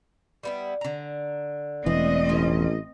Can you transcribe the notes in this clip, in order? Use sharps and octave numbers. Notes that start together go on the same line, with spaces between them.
G3 B3 E4
D3 A#5
E1 E3 A3 C4 D4 D#5
A1 F3 C#4